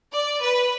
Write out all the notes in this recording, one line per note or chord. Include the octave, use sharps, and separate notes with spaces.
D5
B4